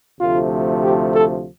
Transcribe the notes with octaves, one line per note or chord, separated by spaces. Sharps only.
D2 C3 F3 A3 F4
G4
A4